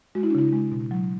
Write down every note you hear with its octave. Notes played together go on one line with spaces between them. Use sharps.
G#3 F#4
E4
D4
C#3 E4
G#3
B2
F#3